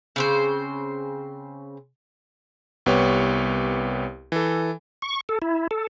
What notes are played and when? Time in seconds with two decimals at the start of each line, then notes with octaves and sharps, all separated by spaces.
0.16 C#3 C4 C5
2.86 C2 B3 G4 B4 C#5 C#6
4.32 E3 A4
5.02 C#6
5.29 A4
5.42 E4
5.71 A4